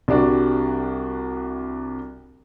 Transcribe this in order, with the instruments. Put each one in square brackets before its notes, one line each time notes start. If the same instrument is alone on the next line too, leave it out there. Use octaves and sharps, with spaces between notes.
[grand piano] C2 G3 D4 F#4